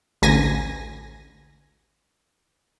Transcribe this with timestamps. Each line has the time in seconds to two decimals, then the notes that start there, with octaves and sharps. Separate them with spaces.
0.22 A1 D2 G#5 A#6